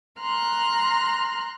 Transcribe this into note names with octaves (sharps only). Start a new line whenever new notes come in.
A#5 C6 F6 F#6